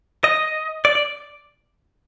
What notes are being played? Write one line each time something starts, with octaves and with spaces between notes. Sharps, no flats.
D#5
D5
D5